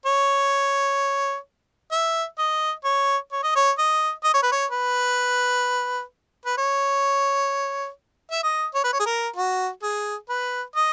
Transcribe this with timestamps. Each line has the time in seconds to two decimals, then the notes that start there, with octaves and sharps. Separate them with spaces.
0.06 C#5
1.91 E5
2.38 D#5
2.84 C#5
3.32 C#5
3.43 D#5
3.55 C#5
3.78 D#5
4.24 D#5
4.34 C#5
4.43 B4
4.52 C#5
4.71 B4
6.45 B4
6.58 C#5
8.31 E5
8.43 D#5
8.75 C#5
8.84 B4
8.93 C#5
8.99 G#4
9.06 A#4
9.36 F#4
9.82 G#4
10.29 B4
10.76 D#5